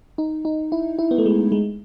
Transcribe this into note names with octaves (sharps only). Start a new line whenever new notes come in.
D#4
D#4
E4
E4
B3
A3
G#3
G#3